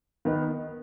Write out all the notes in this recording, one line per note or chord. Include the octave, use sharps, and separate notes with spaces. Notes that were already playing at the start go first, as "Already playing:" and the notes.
D#3 B3 D#4 B4